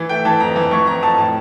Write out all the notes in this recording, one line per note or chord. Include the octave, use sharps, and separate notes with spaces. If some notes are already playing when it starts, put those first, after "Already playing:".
Already playing: E3
A3 G5
E3 A5
F2 A#5
E3
E3 C#6
F2 A#5
F2 A5
A2 A5